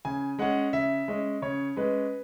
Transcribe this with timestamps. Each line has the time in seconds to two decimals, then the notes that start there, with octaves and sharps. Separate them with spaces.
0.05 C#3 G#5
0.39 G#3 C#4 F#5
0.73 C#3 E5
1.08 G#3 C#4
1.42 C#3 C#5
1.77 G#3 C#4 B4